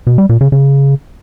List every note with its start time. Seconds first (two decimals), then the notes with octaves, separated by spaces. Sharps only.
0.07 B2
0.18 G3
0.29 A#2
0.41 C#3
0.52 C#3